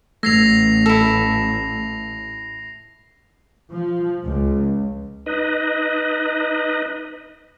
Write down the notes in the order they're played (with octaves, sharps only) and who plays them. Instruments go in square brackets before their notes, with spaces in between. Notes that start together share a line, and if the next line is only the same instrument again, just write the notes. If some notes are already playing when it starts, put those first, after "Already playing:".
[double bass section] A1 [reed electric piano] A3 E6 G#6 [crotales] A#6 C7 F7
[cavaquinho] E4 A4
[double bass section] F3
C#2
[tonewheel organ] D#4 B4 D#5